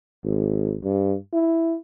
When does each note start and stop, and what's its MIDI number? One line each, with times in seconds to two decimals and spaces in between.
0.23 0.77 32
0.84 1.16 43
1.33 1.76 64